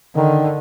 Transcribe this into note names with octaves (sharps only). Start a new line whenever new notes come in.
D3 D#3